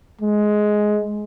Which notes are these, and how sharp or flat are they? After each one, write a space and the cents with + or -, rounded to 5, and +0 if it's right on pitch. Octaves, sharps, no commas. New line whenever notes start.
G#3 +10